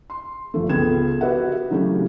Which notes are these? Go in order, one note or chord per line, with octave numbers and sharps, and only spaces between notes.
C6
G1 F3 A3
C#2 B3 A4 G5 G#6 E7
F#4 G4 B4 D#5 E5 F#5
C#3 E3 F#3 A3 C#4 G4